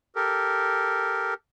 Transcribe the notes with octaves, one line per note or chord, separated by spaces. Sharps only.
G4 A4 A#4